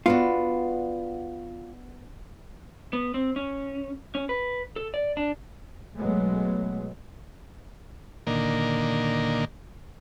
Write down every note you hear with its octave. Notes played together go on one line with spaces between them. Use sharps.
B3 D4 F4 F#4
B3
C4
C#4
C#4
B4
A4
D5
D4
B1 B2 F#3 G#3 A3 B3
A#2 D3 D#3 A#3